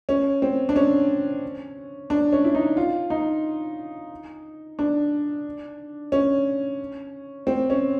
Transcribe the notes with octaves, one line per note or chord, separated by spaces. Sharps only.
C#4
C4
D4
C#4
D4
C#4
E4
D#4
F4
D#4
D4
C#4
C4
C#4